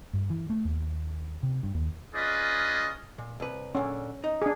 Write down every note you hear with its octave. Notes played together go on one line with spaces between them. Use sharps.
G2
E3
A3
D#2
C3
G2
D#2
C#4 F4 G#4 B4 D5 D#5
A#2
C2 B4
A#2 D3 C#4
D#4
D4 G#4